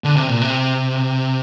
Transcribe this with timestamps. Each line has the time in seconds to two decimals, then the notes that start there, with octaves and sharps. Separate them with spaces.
0.04 D3
0.16 C3
0.29 A#2
0.42 C3